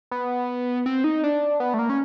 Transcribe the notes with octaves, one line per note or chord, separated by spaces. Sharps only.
B3
C4
D#4
D4
B3
A3
A#3
C#4